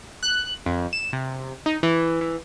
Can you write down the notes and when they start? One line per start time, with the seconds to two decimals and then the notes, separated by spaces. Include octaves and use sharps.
0.23 F#6
0.66 F2
0.93 E7
1.13 C3
1.66 D#4
1.83 E3
2.21 E3